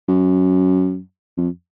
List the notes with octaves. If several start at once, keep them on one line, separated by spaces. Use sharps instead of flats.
F#2
F2